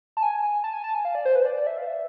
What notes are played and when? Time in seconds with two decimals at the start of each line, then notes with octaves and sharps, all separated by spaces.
0.17 A5
0.23 G#5
0.43 G#5
0.64 A5
0.73 G#5
0.84 A5
0.95 G#5
1.05 F5
1.15 D5
1.25 C5
1.36 B4
1.42 C5
1.45 D5
1.67 E5
1.78 F5
1.87 E5